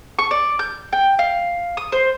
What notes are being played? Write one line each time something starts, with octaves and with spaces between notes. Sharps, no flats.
C#6
D5
G6
G5
F5
D#6
C5